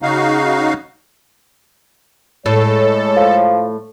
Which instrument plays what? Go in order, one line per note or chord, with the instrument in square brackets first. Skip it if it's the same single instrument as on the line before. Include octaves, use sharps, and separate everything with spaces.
[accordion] C#3 D#4 F#4 F5
[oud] A2 [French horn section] G#3 C#5 [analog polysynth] A4
[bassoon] F3